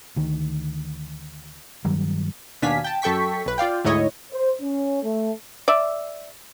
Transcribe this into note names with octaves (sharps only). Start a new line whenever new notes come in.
D2 D#3
G2 D#3 F#3 G3
D#2 B2 D4 F5 G#5 B6
G5 A5
F#2 A4 G5 C#6 B6
B1 B4
F4 D5 F5 G5
D2 G#2 E4 C#5 D#5
C5
C#4
A3
D5 E5